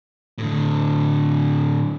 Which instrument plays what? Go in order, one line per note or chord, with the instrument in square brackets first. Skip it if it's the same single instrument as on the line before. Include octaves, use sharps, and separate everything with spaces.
[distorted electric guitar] A2 D3